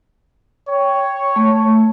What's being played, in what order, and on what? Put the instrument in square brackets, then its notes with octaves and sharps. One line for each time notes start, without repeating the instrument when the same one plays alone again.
[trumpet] C#5 [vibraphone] G5
[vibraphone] A3